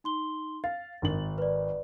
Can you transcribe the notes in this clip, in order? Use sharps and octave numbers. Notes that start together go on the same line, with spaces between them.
D#4 C6 G7
F5 A6
G#1 D#3 F#7
B4 D5